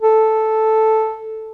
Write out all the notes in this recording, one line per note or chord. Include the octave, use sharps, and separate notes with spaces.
A4